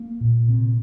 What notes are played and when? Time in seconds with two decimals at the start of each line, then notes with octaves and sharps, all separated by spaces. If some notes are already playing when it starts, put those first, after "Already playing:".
Already playing: A#3
0.21 A#2
0.48 C3